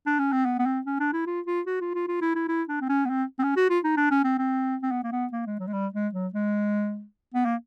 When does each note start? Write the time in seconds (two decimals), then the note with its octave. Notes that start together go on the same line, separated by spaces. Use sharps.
0.06 D4
0.19 C#4
0.32 C4
0.45 B3
0.59 B3
0.66 C4
0.86 C#4
1.00 D4
1.13 E4
1.27 F4
1.47 F4
1.67 F#4
1.81 F4
1.94 F4
2.08 F4
2.21 E4
2.35 E4
2.48 E4
2.69 D4
2.81 C4
2.89 C#4
3.05 B3
3.10 C4
3.39 C4
3.43 C#4
3.56 F#4
3.70 F4
3.84 D#4
3.97 D4
4.11 C#4
4.24 C4
4.38 C4
4.82 C4
4.91 B3
5.04 A#3
5.12 B3
5.33 A#3
5.46 G#3
5.60 F#3
5.67 G#3
5.73 G3
5.94 G#3
6.13 F#3
6.34 G#3
7.34 B3
7.45 A#3